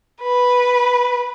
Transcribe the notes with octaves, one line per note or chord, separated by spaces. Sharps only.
B4